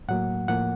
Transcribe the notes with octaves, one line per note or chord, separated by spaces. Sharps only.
A2 F#3 A#3 F#5
A2 F3 A#3 F#5